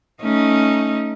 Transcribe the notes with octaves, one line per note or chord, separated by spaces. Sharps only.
A3 C#4 D#4